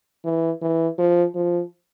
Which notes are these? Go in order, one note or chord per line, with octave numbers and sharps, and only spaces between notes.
E3
E3
F3
F3